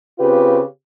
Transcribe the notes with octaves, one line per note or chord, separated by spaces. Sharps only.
C#3 C4 F4 G4 B4